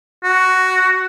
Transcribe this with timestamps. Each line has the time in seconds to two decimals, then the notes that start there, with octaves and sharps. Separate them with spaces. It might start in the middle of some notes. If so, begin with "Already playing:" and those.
0.24 F#4